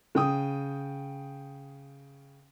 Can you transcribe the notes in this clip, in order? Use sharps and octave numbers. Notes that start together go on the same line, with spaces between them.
C#3 G5 D#6